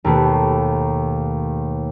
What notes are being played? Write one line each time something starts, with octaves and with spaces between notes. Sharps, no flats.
D#2 B2 A3 A#3 B4